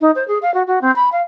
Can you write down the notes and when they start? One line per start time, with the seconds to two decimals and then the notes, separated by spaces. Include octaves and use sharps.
0.01 D#4
0.15 C5
0.28 G#4
0.42 F5
0.54 F#4
0.67 F#4
0.81 C4
0.96 B5
1.12 F5